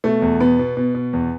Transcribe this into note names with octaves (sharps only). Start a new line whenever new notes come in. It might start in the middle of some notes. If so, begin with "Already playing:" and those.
B2 A3
E2
B2 B3
B2
B2
B2
E2